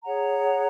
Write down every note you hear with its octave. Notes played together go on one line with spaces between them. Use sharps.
G#4 C#5 F#5 A#5